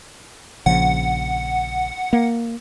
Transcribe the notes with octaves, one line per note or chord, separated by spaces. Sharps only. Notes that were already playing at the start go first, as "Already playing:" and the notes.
A#1 C#3 F3 F#5
A#3